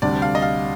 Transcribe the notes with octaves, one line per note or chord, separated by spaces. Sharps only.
D2 C3 G3 D4 D5
F5
D#5
F5